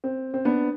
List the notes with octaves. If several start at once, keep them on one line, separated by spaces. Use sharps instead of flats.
C4
C4
B3 D4